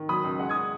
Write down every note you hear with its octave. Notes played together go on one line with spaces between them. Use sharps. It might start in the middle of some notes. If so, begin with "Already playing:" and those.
Already playing: D#3
F#3 B5 D#6
C#2
G#3 F#5
D#6 G#6